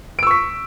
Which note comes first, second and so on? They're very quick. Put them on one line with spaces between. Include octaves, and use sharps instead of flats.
D7 E6 C#6 B6